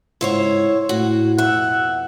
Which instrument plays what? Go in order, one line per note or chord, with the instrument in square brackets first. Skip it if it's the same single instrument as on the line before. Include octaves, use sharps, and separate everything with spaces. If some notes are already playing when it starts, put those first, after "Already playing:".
[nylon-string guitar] G#2 C#3 F#5 [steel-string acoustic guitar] E4 C5 C#5
[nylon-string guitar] A2 [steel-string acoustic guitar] F#4
[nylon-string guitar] F2 B2 [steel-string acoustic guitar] E5 [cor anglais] F#5